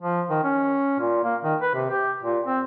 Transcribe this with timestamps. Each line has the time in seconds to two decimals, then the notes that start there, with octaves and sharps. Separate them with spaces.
0.02 F3
0.30 D#3
0.44 C#4
0.99 A#2
1.24 A#3
1.44 D#3
1.62 B4
1.75 C3
1.90 G4
2.23 A#2
2.46 C4